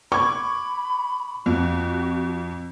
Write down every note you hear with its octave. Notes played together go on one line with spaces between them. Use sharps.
B5 C#6 D6 G#6
F2 F#4